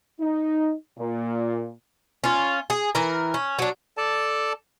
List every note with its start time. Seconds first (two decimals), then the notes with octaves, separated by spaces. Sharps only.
0.20 D#4
0.98 A#2
2.24 C#4 F4
2.70 G#4
2.95 E3 A#4
3.34 C#4
3.59 F#3 D4
3.97 A4 D5 A5